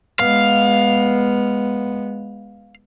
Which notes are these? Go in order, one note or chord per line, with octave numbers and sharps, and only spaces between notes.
G#3 B3 F5